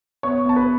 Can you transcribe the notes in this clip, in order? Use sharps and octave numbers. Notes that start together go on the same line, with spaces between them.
B3 C#5 C#6
B3 A5
B4 B5